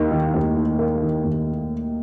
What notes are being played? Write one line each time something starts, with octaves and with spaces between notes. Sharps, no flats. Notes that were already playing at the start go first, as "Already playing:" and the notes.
Already playing: D#2 A#3 D#4
D#3
D#2
D#4
A#3
D#3
D#2